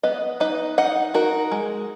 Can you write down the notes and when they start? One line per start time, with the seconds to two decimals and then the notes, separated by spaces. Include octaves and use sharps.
0.03 B3 B4 D#5
0.40 D#4 B4 D#5
0.78 D#4 D#5 F#5
1.14 D#4 F#4 A#4
1.51 G#3